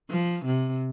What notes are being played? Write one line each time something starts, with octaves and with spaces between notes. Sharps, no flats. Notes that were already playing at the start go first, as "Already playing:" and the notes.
F3
C3